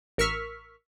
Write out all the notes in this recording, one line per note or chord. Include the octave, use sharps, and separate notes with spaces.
A1 A#4 C#6 E6 F6 B6